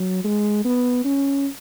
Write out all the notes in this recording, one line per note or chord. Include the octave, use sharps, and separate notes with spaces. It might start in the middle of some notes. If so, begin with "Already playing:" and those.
Already playing: F#3
G#3
B3
C#4